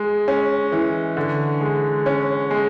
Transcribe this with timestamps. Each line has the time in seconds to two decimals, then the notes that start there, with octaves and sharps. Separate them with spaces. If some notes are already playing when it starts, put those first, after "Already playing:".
Already playing: G#3
0.28 C#4
0.72 E3
1.17 D3
1.61 G#3
2.06 C#4
2.51 G#3